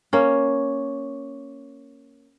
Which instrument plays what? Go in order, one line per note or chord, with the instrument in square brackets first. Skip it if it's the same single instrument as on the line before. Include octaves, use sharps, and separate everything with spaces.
[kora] A#3 C#4